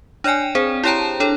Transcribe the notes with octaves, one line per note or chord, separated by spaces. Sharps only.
D4 C#5 D5 G5 G#5
C4 G#4 C5
E4 G4 C#5 G5 A5 A#5
D4 A4 C#5